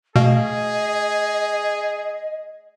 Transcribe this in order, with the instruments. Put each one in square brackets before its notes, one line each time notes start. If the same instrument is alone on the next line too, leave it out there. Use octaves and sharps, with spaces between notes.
[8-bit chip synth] B2 [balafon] A3 [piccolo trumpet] G#4 [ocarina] D#5